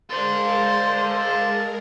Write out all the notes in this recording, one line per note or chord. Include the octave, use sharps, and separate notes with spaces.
G#3 A4 A#4 C5 D5 F5